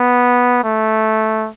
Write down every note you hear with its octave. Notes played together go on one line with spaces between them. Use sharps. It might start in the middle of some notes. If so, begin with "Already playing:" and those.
Already playing: B3
A3